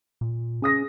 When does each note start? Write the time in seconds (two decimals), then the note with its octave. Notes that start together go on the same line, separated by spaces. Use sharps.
0.21 A#2
0.62 C#4 G#4 D#6 A#6